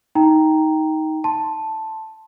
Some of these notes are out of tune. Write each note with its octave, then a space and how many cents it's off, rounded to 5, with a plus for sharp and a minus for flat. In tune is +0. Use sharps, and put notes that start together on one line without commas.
D#4 +15 G5 +0 A#5 +0
A5 +0 C6 +5